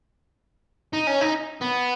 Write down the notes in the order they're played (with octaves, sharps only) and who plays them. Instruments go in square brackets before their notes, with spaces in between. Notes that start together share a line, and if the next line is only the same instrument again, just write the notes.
[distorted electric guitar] D#4
C#4
D#4
B3